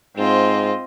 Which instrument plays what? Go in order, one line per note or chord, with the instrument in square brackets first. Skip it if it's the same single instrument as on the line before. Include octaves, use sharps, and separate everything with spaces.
[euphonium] G#2 [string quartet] C4 F4 D#5